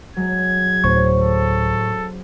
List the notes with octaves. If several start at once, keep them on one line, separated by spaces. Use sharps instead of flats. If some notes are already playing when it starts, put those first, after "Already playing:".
F#3 G#3 G#6
D2 A2 C#4 C5 C#6
A4